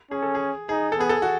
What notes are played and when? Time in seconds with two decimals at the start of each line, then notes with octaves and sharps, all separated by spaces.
0.11 C#4 G#4
0.22 A4
0.35 G#4
0.69 D#4 G#4
0.92 A4
0.98 B3 G#4
1.09 A4
1.22 F#4